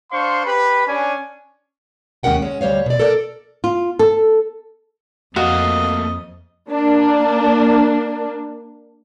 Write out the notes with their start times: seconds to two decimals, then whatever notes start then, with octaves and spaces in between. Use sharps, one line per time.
0.12 D4 C5 F5 C6 C#6
0.45 G4 B4 B5
0.87 C#4 D4 D5 G#5
2.23 D#2 G#3 C#4 A#4 F#5 G5
2.42 G#3 C#4
2.61 D2 G3 C5 C#5 F5
2.86 B2 D5
3.00 A4 A#4 D5
3.64 F4
3.99 A4
5.36 F2 A3 A#3 F#4 D#5 F5
6.69 A#3 D4